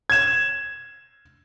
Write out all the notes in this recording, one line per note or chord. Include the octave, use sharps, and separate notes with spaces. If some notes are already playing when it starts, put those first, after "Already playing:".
G#6 E7